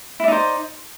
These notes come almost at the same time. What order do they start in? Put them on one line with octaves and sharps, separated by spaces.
E4 D5 D#4 C5